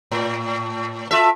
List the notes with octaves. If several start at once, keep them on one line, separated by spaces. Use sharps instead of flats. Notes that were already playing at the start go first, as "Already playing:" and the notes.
A2
F4 A4 E5